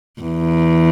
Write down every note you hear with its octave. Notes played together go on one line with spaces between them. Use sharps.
E2